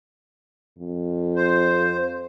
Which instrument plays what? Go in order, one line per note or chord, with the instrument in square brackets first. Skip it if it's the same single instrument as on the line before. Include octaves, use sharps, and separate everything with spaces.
[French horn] F2
[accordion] C5